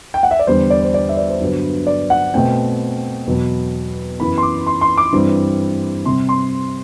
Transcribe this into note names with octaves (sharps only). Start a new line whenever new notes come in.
G5
F#5
E5
D5
E2 D3 G3 C5
D5
C5
D5
E5
D5
C5
G2 D3 F#3 B3
D5
F#5
B2 A3 C4 G5
E2 B2 F#3 B3
F#2 E3 B3 B5
C6
D6
C6
C6
D6
G2 E3 G3 C4
C3 G3 C4 C6
C6